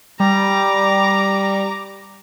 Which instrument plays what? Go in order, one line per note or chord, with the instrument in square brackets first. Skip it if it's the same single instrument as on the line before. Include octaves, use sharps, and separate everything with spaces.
[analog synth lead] G3 [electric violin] A#5 D6